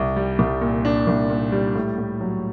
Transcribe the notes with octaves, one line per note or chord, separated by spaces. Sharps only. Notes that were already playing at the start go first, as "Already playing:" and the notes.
Already playing: C2
G3
C2
A#2
D4
C2
A#2
G3
A2
A2
F#3